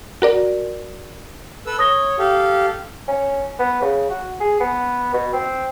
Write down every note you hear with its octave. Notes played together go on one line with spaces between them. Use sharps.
F#4 A#4 D5
A4 B4 E6
C#5 D#6 A#6 G7
G4 A4 F5
C#4
B3
C#3
F#4
G#4
B3
B2
C4